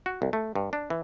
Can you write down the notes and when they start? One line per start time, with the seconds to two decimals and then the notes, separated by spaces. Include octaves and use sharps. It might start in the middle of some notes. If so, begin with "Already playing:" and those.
0.06 F#4
0.22 C2
0.33 A3
0.55 G2
0.73 D4
0.90 E3